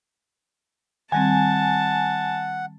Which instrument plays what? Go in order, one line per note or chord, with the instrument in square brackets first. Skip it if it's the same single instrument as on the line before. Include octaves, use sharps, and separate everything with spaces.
[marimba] D#3 G3 C4 [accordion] F#5 [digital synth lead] G#5 [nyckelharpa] A5